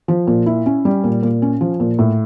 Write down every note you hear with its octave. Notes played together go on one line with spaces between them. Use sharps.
F3
A#2
E4
C#4
G3
A#2
A#2
C#4
F3
A#2
A2